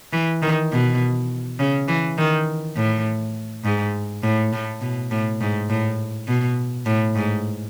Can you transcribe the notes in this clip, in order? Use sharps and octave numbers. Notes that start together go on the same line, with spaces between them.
E3
D#3
B2
C#3
E3
D#3
A2
G#2
A2
A2
B2
A2
G#2
A2
B2
A2
G#2